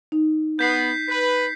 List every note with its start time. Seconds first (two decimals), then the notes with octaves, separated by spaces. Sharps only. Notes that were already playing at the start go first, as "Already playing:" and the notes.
0.12 D#4
0.59 B3 G6 B6 C7
1.08 B4 B6